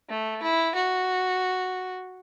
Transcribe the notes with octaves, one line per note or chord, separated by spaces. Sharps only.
A3
E4
F#4